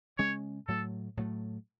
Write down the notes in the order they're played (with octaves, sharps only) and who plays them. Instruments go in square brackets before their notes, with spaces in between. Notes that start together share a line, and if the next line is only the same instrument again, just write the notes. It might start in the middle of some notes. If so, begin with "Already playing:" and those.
[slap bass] C#3 G#3 C#4 [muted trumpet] C#5
[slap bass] A2 F#3 A3 [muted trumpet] A4
[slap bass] A2 F#3 A3